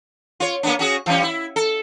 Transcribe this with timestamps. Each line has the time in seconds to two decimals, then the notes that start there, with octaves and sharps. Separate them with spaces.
0.40 F4 C#5
0.63 A#3 B3 D4
0.79 C#4 F#4 G#4
1.06 E3 G3 C#4
1.23 E4
1.56 A4